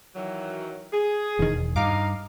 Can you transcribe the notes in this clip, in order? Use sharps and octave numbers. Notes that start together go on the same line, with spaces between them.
D#3 E3 F#3
G#4
E1 E2 D#3
G2 D#4 F5 D6